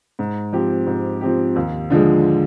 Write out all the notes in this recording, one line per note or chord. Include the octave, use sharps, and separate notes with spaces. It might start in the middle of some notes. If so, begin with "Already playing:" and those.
G#2
F3 C4 G4
G#2
F3 C4 G4
D#2
D3 F3 G#3